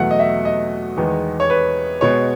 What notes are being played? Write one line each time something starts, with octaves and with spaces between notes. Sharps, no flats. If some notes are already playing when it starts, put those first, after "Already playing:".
Already playing: E2 B2 F#3 A3 F#5
D#5
E5
D#5
E2 D#3 G#3 B3
C#5
B4
B2 G#3 B3 C#5